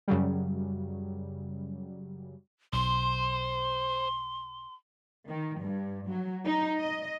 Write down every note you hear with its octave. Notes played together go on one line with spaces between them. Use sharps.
F#2 C#3 F#3 G3
B1 C5 C6
D#3
G2
F#3
D#4
D#5